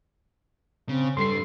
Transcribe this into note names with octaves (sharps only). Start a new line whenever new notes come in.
C#3 C4
G2 G3 A4 C6 C7